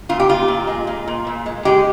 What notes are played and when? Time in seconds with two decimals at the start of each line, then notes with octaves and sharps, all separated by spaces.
0.09 A#2 F4
0.20 G4
0.29 A#2 F4
0.48 A#2
0.67 G#3
0.87 A#2
1.08 A#2
1.27 A#2
1.46 G#3
1.65 G#3 G4